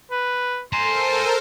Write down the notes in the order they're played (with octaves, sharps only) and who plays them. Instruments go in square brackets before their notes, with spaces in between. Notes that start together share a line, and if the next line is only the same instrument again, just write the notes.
[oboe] B4
[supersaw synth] A4 A#4 C5 [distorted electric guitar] G#5 A#5 [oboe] C6